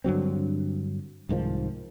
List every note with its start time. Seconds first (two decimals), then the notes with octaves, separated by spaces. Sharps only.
0.04 G2 D3 F#3 C4
1.29 C2 G#2 D#3 F3